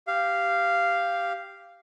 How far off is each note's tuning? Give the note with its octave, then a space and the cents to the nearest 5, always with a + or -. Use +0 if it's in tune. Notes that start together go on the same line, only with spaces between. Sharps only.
G4 +0 F5 -10